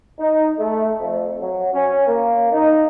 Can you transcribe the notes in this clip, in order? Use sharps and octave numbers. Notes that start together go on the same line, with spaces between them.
D#4
A3
F2
F#3
C#4
A#3
D#4